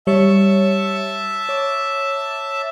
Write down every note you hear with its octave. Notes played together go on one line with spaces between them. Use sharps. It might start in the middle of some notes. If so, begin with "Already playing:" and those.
G3 C#5 E5 A5 C#7
C#5 D6